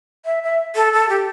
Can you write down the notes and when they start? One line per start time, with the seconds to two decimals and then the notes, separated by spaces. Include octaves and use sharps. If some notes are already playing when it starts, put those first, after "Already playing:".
0.26 E5
0.43 E5
0.75 A4
0.93 A4
1.09 G4